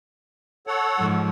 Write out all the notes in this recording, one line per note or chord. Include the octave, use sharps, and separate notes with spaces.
A4 C#5 F#5
G#2 F3